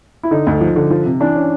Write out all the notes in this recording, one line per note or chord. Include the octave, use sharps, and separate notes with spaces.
E4
D3 D#4
D2
F3
D3
F3
C3
E3 D4
C#4